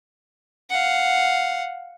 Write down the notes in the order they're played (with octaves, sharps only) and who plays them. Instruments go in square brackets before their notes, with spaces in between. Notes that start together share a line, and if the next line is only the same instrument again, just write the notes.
[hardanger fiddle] F5 F#5